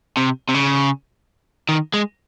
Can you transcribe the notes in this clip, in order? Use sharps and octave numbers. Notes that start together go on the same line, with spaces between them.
C3
C3
C#3
D#3
G#3